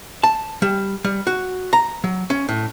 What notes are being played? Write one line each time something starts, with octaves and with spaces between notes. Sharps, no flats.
A5
G3
G3
F#4
A#5
F#3
C#4
A2